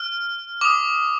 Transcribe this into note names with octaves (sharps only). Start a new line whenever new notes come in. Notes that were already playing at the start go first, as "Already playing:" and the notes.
Already playing: F6
D6
D#6